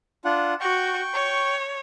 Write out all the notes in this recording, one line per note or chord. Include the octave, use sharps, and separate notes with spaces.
D4 F4 F#5
F#4 G5 C#6
C#5